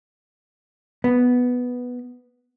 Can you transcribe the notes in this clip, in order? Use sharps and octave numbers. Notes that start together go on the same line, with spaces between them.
B3